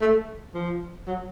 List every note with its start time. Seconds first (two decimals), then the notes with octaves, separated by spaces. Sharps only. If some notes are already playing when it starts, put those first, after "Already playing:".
0.01 A3
0.54 F3
1.07 F#3